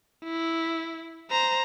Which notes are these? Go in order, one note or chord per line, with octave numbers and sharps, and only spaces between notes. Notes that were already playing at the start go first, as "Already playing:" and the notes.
E4
C5 A#5